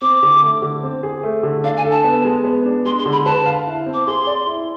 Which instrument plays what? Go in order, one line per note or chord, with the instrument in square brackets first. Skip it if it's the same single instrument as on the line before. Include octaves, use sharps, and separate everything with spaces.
[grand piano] C4 [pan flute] D6
[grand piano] D3
A3
D3
C4
G#4
A3
D3
[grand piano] D4 [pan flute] F5
[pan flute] G#5
[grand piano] A4
[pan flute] A5
[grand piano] B3
G#3
B3
D4
[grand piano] G#3 [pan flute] C6
[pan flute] C6
[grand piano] D3
[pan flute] B5
[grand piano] B4 [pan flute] A5
[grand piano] F5
E4
C4
[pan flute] D6
[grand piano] G#4 [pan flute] C6
[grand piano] D5
E4